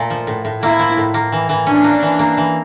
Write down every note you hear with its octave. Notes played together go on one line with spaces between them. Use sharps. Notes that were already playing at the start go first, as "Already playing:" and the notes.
Already playing: A#2 A3
F3
A2
A2
A#3 E4
F3
A2
A#3
E3
E3
C#4 D4
A#3
E3
A#3
E3